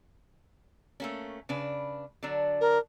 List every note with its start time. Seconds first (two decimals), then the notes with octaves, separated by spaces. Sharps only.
1.00 A3 A#3 C#4
1.49 C#3 D4 B4
2.23 D3 F#3 D4
2.61 A#4